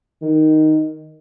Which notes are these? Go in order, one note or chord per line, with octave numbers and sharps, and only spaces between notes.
D#3